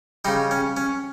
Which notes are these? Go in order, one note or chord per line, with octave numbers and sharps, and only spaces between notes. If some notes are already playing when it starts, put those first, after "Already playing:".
C#3 G3 D#4
C#4
C#4